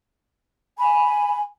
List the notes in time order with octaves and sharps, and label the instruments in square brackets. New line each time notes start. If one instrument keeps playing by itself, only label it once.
[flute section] G#5 B5